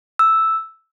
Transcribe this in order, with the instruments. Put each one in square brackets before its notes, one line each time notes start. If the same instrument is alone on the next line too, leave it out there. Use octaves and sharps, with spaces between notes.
[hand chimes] E6